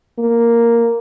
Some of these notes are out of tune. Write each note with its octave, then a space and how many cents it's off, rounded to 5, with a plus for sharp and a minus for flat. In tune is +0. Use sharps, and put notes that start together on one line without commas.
A#3 +0